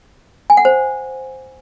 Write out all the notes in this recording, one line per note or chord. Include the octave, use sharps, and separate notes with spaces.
G#5
F#5
C5